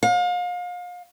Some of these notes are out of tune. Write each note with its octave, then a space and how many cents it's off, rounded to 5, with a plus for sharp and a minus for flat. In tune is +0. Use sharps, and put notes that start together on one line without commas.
F5 +35